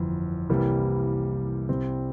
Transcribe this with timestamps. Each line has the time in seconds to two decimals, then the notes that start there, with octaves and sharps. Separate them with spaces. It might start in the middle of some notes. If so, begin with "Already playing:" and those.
Already playing: G1 F2 E3
0.49 C2 C3 E3 G3 A#3
1.69 C2 C3 G3 C4